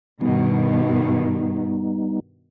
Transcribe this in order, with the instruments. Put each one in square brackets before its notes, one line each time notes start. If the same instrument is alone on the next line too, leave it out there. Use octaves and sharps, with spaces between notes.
[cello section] G2 B2 D#3 [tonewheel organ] G3 B3 D#4